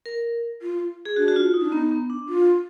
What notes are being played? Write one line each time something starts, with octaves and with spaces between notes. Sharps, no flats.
A#4
F4
G#4
D4 F#4
F#4
F4
D#4
D4
B3 D#4
B3
D4
F4